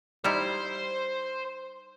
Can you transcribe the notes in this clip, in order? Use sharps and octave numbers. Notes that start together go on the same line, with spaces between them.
G3 D#4 E4 C5